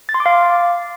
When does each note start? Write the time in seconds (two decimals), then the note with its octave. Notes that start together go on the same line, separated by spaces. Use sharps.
0.09 A6
0.14 C6
0.20 D6
0.26 F5